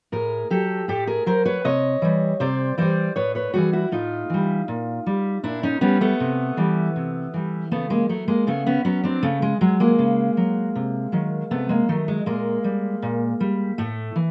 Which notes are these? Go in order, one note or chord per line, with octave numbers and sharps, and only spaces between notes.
A2 G#4 A#4
F#3 G4 A4
A2 G4 A4
G#4 A#4
F#3 A#4 C5
B4 C#5
C3 C#5 D#5
E3 G3
C3 C5 D5
E3 G3 C5 D5
A2 B4 C#5
B4 C#5
E3 G3 F#4 G#4
E4 F#4
A2 D#4 F4
E3 G3
A#2
G3
A#2 D4 E4
C#4 D#4
G3 B3 C#4
A3 B3
C3
E3 G3
C3
E3 G3
C#3 A3 B3
G#3 A#3
F#3 A3
G#3 A#3
C#3 A3 B3
B3 C#4
F#3 B3 C#4
C4 D4
C#3 A3
G#3
F#3 G#3
G#3 A#3
C#3
F#3
C3
D#3 F#3
C3 A3 B3
G#3 A#3
D#3 F#3 A3
G#3
A#2 G#3 A#3
G3
A#2
G3
A2 A3
E3